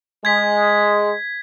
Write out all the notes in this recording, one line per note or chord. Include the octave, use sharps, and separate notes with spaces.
G#3 G#6 B6